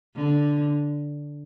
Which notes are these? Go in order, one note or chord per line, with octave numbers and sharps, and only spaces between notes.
D3